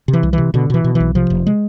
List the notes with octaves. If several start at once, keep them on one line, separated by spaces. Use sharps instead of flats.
C3
E3
C2
C3 E3
B2 D3
B2 E3
B2
E3
B1
C3 F3
F1
G#3